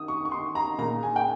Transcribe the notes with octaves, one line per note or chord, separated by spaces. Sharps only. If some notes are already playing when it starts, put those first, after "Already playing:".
Already playing: D#3 D#6
C#6
C#6
C6
A#5
A#2 G#3 A#5
G#5
G5